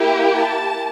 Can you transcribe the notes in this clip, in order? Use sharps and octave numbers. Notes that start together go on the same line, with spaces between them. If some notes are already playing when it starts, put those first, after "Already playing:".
Already playing: A#3 E4 G4
A5